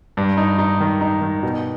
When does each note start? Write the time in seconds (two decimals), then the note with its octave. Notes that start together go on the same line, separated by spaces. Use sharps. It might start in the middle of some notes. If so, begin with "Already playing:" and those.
0.17 G2
0.37 D#4
0.59 D#4
0.80 D#3
1.01 D#4
1.21 D#3
1.43 B2